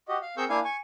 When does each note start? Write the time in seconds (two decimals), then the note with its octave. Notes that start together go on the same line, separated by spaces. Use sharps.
0.09 F#4 G4 D#5
0.22 F5
0.37 C4 G#4 A#4 C#6 E6 G6
0.49 A#3 D4 E4 F5 G#5
0.65 G#5 C#6